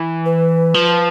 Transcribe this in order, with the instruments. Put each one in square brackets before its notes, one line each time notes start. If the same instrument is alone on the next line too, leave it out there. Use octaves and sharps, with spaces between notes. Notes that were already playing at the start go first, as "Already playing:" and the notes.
Already playing: [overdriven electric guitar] E3
[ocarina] B4
[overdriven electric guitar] F3